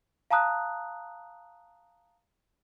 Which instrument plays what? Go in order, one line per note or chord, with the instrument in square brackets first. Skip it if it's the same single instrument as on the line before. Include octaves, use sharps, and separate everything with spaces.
[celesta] F5 A5 A#5 D#6 F#6